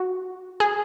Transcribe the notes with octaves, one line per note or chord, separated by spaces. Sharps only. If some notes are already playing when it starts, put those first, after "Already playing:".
Already playing: F#4
G#4